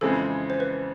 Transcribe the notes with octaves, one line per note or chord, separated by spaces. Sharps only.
F2 C#3 E3 G#3 C4 A4
C5
B4